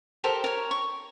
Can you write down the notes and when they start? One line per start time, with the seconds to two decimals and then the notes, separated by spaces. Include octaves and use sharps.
0.24 G4 A4 A#4 C5
0.44 A#4 C#5
0.71 C#6